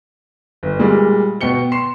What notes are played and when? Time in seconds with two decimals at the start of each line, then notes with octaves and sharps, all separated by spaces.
0.63 G1
0.79 A#2 G3 G#3
1.41 B2 G5 C#7 G7
1.72 C6 C7 E7